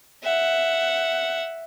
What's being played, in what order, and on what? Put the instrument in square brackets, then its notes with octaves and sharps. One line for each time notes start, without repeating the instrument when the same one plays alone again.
[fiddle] E5 F#5